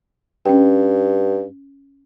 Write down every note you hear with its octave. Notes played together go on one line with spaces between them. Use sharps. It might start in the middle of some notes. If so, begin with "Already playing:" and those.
G2 C#4 G5